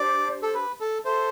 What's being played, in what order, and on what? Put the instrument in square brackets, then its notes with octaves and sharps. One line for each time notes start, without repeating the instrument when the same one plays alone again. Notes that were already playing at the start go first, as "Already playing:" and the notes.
Already playing: [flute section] D4 G4 C5 [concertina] D5
[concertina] A4
B4
A4
[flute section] A4 E5 A5 C6 [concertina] C5